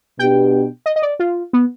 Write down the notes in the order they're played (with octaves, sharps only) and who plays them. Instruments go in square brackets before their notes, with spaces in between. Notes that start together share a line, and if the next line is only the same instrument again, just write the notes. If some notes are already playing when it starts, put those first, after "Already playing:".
[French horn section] B2 B3 D4 G4 [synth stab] G5
[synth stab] D#5
D#5
D5
F4
B3